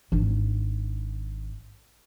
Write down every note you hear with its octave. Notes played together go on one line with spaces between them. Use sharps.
G#1 D4